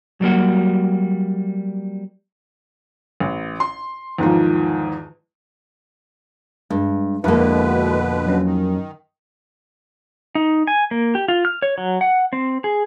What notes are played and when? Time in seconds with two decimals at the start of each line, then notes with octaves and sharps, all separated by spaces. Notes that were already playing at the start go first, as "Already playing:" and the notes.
0.21 F#3 G3 A#3 F#4
3.20 A1
3.60 C6
4.18 E2 G#2 D#3 F3
6.70 G2 G#3
7.24 F2 B2 D3 G#3 A#3 E4 B4
8.26 F#3 C#4
8.44 D#3
10.35 D#4
10.67 G#5
10.91 A#3
11.15 G4
11.28 F4
11.45 F6
11.62 C#5
11.78 F#3
12.01 F#5
12.33 C4
12.64 G#4